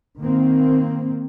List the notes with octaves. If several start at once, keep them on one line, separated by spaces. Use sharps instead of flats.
D#3 A#3 C4